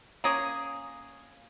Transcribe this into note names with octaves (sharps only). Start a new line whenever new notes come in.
A#3 C#4 G#4